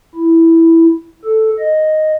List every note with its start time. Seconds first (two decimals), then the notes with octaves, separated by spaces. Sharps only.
0.15 E4
1.24 A4
1.59 D#5